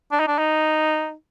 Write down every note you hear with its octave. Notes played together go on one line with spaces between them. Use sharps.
D4
D#4
D4
D#4